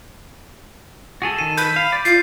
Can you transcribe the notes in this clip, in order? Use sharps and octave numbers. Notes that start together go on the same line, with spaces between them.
F#4 G#4 A4
D#3 A4 D#7
B5 G6
F5
D5
F4 C7